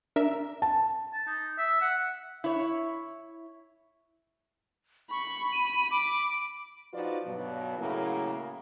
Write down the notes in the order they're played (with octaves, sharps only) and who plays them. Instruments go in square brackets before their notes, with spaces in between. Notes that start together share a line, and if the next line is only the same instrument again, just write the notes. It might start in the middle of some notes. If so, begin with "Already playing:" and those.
[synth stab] D4 A#4 E5
[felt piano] A5
[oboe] A5
D#4
E5
F#5
[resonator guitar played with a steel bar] E4 C#5
[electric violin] B5 [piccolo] C#6
[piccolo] D#7
D6
[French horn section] F3 D#4 F4 F#4 B4 D5
G2 B2 F#3
A2 C#3 F#3 A#3 E4 G#4